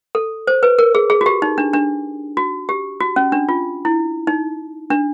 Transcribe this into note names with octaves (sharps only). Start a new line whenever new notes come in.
A4
C5
B4
A#4
G#4
G#4
F#4
G4
D#4
D4
D4
F#4
G4
F#4
C#4
D4
F4
E4
D#4
D4